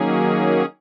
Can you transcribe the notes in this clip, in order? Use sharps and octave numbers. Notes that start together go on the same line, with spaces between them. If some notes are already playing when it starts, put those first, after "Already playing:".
Already playing: D#3 F#3 A#3 C#4 G#4